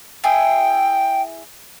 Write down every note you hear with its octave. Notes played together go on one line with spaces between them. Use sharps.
E4 G#4 G5